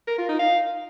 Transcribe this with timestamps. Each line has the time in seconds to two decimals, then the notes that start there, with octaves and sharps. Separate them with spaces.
0.07 A#4
0.18 F4
0.29 D#4
0.39 F5